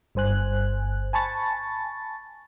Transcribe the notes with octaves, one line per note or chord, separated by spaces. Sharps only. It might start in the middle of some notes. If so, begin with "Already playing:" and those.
G1 G2 C5 G#5 F#6
G#5 A5 B5 C#6 A6